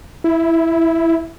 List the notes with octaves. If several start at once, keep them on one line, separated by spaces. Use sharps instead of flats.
E4